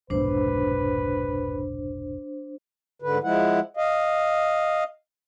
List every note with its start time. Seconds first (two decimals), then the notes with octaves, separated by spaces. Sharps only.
0.10 F1 B1 G#2 D4 B4 C5
3.02 G#2 D3 B4
3.24 F3 G#3 E4 F#5
3.77 D#5 F5